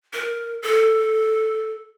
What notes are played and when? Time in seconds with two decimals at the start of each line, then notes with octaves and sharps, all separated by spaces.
0.13 A#4
0.62 A4